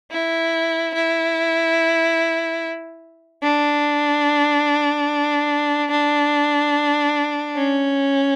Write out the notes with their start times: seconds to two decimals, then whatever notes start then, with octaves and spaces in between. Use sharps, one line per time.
0.11 E4
0.94 E4
3.42 D4
5.91 D4
7.56 C#4